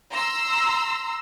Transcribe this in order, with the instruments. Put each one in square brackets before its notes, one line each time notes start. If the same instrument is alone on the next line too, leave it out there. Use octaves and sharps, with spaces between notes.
[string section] A#5 C6 E6